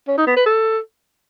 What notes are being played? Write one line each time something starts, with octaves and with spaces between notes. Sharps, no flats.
C#4
D#4
B3
B4
A4